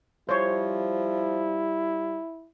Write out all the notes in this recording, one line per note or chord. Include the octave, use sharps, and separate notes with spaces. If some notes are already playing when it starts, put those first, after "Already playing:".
F3 G3 E4 C5 C#5